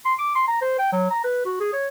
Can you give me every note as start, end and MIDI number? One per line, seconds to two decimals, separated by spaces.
0.05 0.13 84
0.18 0.34 86
0.35 0.47 84
0.48 0.60 82
0.61 0.75 72
0.79 0.92 79
0.92 1.07 54
1.10 1.19 82
1.24 1.43 71
1.45 1.59 66
1.60 1.71 68
1.72 1.88 73